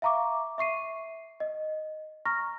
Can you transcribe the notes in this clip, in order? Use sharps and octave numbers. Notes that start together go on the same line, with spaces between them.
E5 F5 A#5 C#6 D6
E5 C#6 C7 D#7
D#5
A#5 C#6 F6 A#6